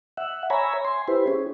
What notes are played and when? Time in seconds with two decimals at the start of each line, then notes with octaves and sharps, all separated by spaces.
0.17 E5 F#5
0.50 C#5 E5 G#5 A#5 B5
0.85 G#5 C6
1.08 E4 G4 B4 C5
1.28 C#4 G#4